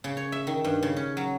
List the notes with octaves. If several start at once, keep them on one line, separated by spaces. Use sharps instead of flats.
C#3
C#5
E5
D#3
G2
C#3
C#4
F#3